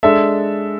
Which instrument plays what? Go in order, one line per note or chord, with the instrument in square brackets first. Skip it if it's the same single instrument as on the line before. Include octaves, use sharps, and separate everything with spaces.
[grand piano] G#3 D4 A4 E5